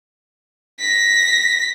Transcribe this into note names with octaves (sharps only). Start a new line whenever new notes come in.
A#6 B6